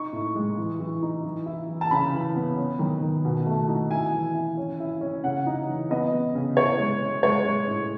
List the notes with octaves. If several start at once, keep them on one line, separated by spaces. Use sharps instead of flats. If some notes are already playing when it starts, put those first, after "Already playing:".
Already playing: D#4 C#6
A2
G#3
E3
E3
D#4
E3
E4
E3
A5
C#3 B5
E3
B3
C#4
D#3
D#3
B2
A3
D#4
E4 G#5
E3
E4
C#4
E4
C#4
C#3 F#5
D#4
E3
B3 D#5
B3
C#3
E4 C#5
G#3
C#4
G#3 C#5
G#3
A2